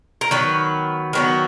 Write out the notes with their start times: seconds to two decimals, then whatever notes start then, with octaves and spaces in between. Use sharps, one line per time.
0.21 A#4
0.31 D#3 F#3 B3 B4
1.13 D#3 F#3 B3